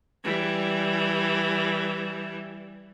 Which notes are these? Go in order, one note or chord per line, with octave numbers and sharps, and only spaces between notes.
E3 G3